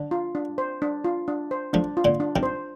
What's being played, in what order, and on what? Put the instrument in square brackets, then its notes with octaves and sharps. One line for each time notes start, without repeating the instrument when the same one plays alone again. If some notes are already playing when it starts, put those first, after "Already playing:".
Already playing: [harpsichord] D3 [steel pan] D4
[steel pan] F4
D4
C5
D4
F4
D4
C5
[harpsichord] F3 A3 [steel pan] D4
[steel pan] F4
[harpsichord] A#2 D3
[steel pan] D4
[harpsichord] C3 D#3
[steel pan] C5